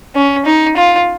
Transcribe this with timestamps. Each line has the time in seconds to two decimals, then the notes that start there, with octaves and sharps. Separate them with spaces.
0.15 C#4
0.45 D#4
0.76 F4